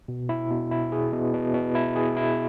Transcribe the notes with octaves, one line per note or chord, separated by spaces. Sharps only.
B2
E4
B2
E4
G#4
B2
B2
B2
E4
G#4
E4